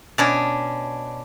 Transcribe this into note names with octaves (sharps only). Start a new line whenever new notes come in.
B2 C#4 D4